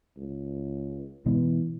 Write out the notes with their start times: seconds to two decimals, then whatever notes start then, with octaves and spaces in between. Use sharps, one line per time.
0.17 C#2
1.26 B2 E3 G#3 B3